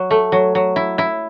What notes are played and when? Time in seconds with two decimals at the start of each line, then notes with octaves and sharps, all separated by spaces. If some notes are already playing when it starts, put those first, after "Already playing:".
Already playing: F#3
0.11 A3
0.32 F#3
0.55 F#3
0.76 E4
0.98 E4